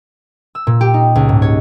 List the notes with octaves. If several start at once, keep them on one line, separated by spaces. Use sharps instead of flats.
E6
A#2
G4
D#4
C#2
G#2
C#5